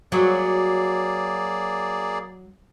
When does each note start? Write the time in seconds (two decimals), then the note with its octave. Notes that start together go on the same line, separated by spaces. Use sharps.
0.12 F#3 A#3 G#4 D5